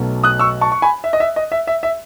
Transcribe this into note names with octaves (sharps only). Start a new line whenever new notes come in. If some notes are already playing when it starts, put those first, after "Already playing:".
Already playing: B1 B2 F#3 A3
D#6 F#6
C#6 E6
A5 C#6
C#6
G#5 B5
E5
D#5
E5
D#5
E5
E5
E5